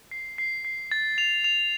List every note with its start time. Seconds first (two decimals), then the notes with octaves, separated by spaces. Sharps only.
0.11 C7
0.38 C7
0.65 C7
0.91 A6
1.18 F7
1.44 F7